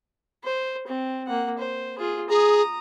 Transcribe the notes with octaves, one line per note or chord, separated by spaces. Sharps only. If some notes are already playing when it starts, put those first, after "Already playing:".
C5
C4
A#3 F#5
C5
F4 G#4
G#4 A#5 D#6